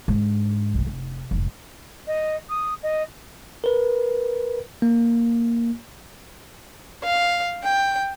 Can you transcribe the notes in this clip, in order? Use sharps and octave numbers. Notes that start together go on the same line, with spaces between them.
G#2 D3
B1 D#3
F1
F1 G#2
D#5
D#6
D#5
A#4 B4
A#3
F5
G5